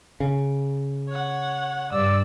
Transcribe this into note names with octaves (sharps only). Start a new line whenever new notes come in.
C#3
C#5 F#5
G2 D5 E6